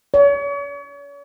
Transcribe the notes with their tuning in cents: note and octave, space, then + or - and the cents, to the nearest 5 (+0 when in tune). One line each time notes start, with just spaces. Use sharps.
C#5 +40